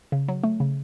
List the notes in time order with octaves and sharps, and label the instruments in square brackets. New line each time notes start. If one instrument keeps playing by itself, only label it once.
[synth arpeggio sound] C#3
F#3
A3
C#3